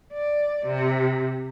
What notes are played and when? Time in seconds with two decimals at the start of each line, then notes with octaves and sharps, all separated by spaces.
0.14 D5
0.67 C3